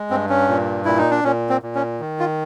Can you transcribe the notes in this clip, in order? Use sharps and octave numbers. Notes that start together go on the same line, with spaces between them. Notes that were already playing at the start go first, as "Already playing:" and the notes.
Already playing: G#3
G2 C4
C#4
A#2
A#2 E4
D#4
D4
A#2 C#4
C4
A#2
C#4
D#3
F4